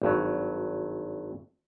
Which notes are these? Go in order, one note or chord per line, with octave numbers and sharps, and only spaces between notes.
G#1 G2 F#3